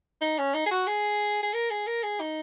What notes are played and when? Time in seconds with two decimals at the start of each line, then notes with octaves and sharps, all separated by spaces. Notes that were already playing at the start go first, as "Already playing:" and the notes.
0.21 D#4
0.38 C#4
0.54 D#4
0.66 G#4
0.71 F#4
0.87 G#4
1.43 G#4
1.54 A#4
1.70 G#4
1.87 A#4
2.03 G#4
2.20 D#4